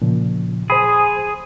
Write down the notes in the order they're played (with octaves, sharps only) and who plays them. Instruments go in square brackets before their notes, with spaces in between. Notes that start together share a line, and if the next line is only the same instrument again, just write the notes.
[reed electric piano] A#2 C#3 F3
[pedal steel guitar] G#4 [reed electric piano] C5 G#5 B5